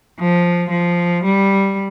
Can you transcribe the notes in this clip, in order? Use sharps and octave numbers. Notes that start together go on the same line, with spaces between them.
F3
F3
G3